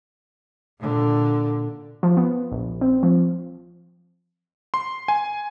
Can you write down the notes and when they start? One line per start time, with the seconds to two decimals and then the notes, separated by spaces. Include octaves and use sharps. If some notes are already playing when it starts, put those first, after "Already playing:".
0.79 A#2 D3
2.03 F3
2.17 B3
2.52 A#1
2.81 C4
3.03 F3
4.74 C6
5.08 G#5